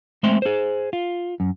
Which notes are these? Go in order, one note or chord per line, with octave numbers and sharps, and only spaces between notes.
G#3 A3 C4 E5 C6
G#4 C5
F4
F#2